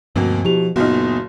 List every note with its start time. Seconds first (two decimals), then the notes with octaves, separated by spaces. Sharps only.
0.16 D2 G2 B2 F3 A#3 C4
0.45 B2 F3 E4 G4 F7
0.76 F#1 A#2 B3 D#4 F#4 F6